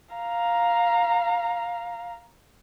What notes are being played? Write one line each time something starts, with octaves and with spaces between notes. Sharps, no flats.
F5 A#5